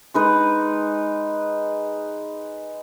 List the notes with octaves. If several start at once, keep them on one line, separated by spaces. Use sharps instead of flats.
G#3 D#4 B4